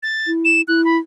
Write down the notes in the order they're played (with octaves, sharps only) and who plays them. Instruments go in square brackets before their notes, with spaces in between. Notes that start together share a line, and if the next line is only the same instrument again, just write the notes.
[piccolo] A6
[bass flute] E4
[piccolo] E7
[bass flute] E4 [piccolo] F#6
[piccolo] B5